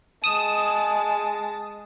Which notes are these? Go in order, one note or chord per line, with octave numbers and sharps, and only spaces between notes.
G#3 A5 D#6 E7